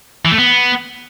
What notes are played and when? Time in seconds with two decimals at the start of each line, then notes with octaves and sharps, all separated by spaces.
0.25 E3
0.31 A3
0.38 B3